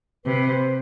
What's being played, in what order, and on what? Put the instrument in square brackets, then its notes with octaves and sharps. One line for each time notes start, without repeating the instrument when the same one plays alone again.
[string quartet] C3 [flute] B4
[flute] C5